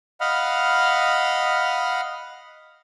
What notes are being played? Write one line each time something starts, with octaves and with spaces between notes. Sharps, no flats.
D#5 F5 F#5 B5 F6